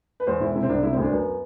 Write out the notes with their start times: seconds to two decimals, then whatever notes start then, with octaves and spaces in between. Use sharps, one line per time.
0.20 B4
0.27 E2 C5
0.40 E1 E4
0.55 C3 E4
0.63 C4
0.69 C2 D4
0.83 C3 E4
0.93 D2 C4
1.02 D4
1.11 F#2 B3